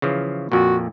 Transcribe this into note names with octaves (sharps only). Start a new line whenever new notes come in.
C#3 E3 F3
F2 A#2 F#4